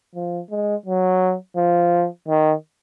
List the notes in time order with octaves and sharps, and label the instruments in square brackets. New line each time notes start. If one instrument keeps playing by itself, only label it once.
[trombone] F3
G#3
F#3
F3
D#3